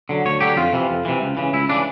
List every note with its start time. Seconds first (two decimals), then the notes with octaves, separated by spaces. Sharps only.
0.09 D3 F#3
0.25 D2 C#5
0.41 D3 F#3 G4
0.57 F2 F4
0.73 C3 E3
0.90 F2
1.05 C3 E3
1.21 C#2
1.37 C#3 E3
1.53 C#2 E4
1.69 C#3 E3 D4